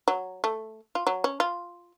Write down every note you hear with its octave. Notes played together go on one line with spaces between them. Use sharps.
F#3
A3
F4
F#3
C#4
F4